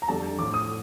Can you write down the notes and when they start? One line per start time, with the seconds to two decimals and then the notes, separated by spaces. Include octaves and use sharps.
0.02 A#5
0.08 F2 D3 G3 A5
0.38 F3 D6
0.42 A2
0.54 D#6